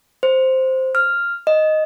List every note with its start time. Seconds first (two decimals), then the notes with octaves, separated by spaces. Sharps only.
0.23 C5
0.95 F6
1.47 D#5